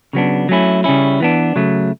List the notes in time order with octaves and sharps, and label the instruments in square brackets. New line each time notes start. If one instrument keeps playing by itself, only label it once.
[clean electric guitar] C#3 F#3 B3 D4
F#3 A3 C#4 E4
C#3 G3 C#4 E4
E3 B3 D4
C#3 F#3 A3